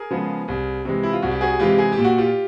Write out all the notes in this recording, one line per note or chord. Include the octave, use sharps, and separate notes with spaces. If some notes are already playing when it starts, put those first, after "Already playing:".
Already playing: G#4 A#4
C#3 F3 G#3 B3
C2
C3 E3 G#3
E4
F4
C2 F#4
G4
F#4 G#4
C3 E3 G#3 F4 G4
G#4
G4
A#2
F#4
F4 G4